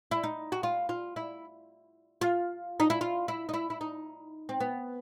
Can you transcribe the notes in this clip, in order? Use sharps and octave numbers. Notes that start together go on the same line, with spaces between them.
E4
D#4
F#4
F4
F4
E4
F4
D#4
E4
F4
E4
D#4
E4
E4
D#4
C4
B3